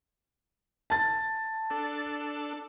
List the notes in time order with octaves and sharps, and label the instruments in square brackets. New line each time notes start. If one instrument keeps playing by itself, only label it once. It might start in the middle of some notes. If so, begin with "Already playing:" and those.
[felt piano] A5 A6
[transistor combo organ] D4 A4